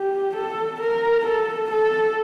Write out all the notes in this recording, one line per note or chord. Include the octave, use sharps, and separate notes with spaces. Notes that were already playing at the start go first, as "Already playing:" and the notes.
Already playing: G4
A4
A#4
A4
A4